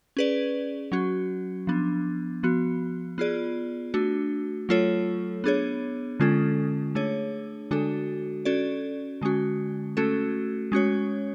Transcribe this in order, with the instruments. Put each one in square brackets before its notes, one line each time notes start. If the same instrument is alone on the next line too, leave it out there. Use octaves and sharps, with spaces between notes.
[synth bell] C#4 G#4 B4 D5
F#3 C#4 F#4
F3 B3 D4
F3 B3 F#4
B3 F4 G#4 D5
A3 D4 F#4
F#3 A3 F4 A4 C#5
B3 D4 G#4 C#5
D3 G#3 C#4 F4 A4
A3 D4 G#4 C#5
D3 G#3 D4 F#4 A4
C#4 F#4 A4 D5
D3 G#3 C#4 F#4
A3 C#4 F#4 A4
G#3 C#4 F#4 C#5